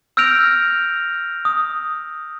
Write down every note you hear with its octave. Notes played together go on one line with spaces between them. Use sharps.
E6 F6 G6 A#6 D7 F7
D#6